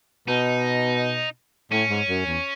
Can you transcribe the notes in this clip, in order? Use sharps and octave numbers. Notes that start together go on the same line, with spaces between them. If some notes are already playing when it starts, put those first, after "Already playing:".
B2 D#4
A2 C#4
G#2
F#2
E2